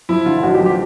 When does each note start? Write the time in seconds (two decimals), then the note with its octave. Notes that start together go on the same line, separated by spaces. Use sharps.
0.09 F3 E4
0.25 D3 F4
0.43 A1 F#4
0.54 G4
0.60 F3
0.66 G4